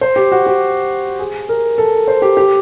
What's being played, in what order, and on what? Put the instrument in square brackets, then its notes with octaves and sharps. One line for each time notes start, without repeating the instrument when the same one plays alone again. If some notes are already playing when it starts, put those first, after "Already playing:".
[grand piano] C5
G4
F#4
G4
G#4
A#4
A4
C5
G4
G4